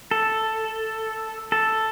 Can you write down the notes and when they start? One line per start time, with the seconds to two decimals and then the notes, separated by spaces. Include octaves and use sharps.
0.11 A4
1.52 A4